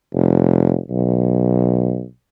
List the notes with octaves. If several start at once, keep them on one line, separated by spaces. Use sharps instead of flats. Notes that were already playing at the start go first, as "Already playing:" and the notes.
F1
B1